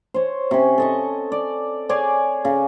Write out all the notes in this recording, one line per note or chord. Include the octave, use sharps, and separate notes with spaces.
C5 C#5
C3 C#4
A4 D#5 C#6
D5
G#4 C#5 D5 G#5
C#3